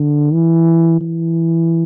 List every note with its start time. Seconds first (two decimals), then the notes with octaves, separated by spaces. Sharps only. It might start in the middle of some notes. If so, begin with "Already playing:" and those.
Already playing: D3
0.33 E3
1.01 E3